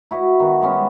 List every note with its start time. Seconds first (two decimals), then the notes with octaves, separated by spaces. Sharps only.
0.11 E4 F#4 B4 D#5
0.40 D#3 B3
0.61 G3 G#3 B3 C#4